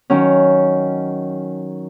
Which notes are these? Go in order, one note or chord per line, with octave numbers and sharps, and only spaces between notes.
D#3 F#3 C#4